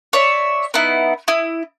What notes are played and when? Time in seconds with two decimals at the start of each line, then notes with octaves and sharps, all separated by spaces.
0.13 C#5 D5 E5
0.74 B3 D#4 E4
1.28 E4 D#6